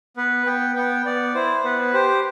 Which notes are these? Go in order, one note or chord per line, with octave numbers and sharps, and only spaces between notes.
B3 B4
B3 G5
B3 G5
B3 D5
E4 C5
B3 B4
G4 C5